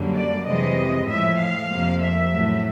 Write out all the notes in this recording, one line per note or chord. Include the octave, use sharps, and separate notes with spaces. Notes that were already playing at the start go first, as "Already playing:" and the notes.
Already playing: F#2 D3 G3 A#3
D5
F2 C3 E3 G#3 D#5
A2 F3 G#3 E5
F5
F2 C3 F3 A#3
E5
A2 F#3 A3